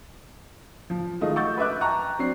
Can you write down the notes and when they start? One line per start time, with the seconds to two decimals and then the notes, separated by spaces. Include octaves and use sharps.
0.90 F3
1.21 D#3 G#3 A3 F4 D#5
1.36 F#5 C#6 E6 G6 A6
1.57 B4 D#5 E5 D6 F#6
1.81 G5 A5 A#5 C#6 F#6
2.19 F#3 C4 D4 C7